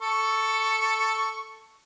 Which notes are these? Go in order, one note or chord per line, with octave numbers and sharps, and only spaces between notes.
A4 C#6